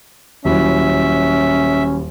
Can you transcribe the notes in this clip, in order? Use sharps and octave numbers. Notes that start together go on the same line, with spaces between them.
D#1 F#3 C#4 E4 E5